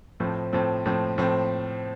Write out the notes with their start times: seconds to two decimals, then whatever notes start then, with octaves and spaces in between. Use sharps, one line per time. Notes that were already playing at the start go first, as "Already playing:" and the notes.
0.20 A2 F3 C4
0.53 A2 F3 C4
0.86 A2 F3 C4
1.18 A2 F3 C4